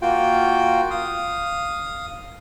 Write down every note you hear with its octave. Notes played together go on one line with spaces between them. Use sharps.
A#3 F4 F#4 G5
F5 D#6